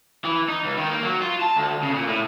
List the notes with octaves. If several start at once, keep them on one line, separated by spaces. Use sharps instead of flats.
E3
D#4
C#2
D#3
A#3
F#3
F4
A5
D2
C#3
A#2
A2